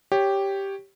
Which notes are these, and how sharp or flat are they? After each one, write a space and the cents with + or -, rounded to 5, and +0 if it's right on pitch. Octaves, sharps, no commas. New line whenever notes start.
G4 +0 C#5 +0